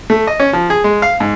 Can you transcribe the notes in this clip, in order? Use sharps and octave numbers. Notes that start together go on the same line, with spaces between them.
A3
D#5
C#4
F3
G#4
G#3
F5
G#2